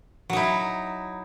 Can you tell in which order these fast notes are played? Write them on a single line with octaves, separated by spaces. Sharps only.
F#3 D#4 E4